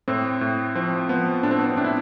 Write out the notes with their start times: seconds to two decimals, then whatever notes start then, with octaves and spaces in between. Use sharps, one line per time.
0.08 A2 C4
0.41 A2
0.75 F3 C4
1.09 F3 B3
1.43 A2 D4
1.51 C4
1.59 B3
1.66 C4
1.77 A2 D4
1.84 E4